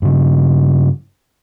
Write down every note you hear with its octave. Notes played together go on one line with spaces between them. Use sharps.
G2 C#3